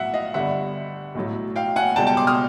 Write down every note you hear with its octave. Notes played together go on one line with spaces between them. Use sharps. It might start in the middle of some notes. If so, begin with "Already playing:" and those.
Already playing: B1 A2 F#3 E5 F#5
D#5 F5
G1 G2 D3 G3 E5 F#5
B1 A2 F#3
F5 G5
F#5 G#5
C#2 B2 G3 G5 A5
G5 A5
C6 D6
D#6 F6